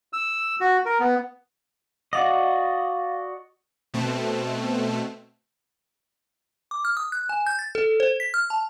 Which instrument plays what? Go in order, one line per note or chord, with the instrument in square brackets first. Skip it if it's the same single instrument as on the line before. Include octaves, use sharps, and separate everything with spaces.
[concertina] E6
F#4
A#4
B3
[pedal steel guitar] F#4 D5 D#5 [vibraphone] F5 F#5
[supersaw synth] B2 A3 C4
[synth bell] D6
F6
D#6
F#6
G#5
G6
A6
A4
C5
B6
F6
A5